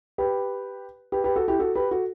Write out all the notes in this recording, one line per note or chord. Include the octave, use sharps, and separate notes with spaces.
G4 B4
G4 B4
G4 B4
F#4 A4
E4 G4
F#4 A4
G4 B4
F#4 A4